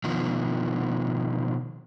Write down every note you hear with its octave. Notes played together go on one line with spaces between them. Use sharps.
B2 D#3 F3